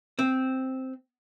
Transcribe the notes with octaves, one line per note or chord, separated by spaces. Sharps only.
C4